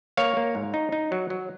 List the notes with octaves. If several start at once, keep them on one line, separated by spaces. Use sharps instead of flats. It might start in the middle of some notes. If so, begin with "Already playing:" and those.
A#3 C#5 F5
A#3
G#2
D#4
D#4
F#3
F#3